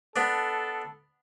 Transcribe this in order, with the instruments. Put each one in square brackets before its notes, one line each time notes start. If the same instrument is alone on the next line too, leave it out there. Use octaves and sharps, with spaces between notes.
[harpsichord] B3 D4 [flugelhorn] A4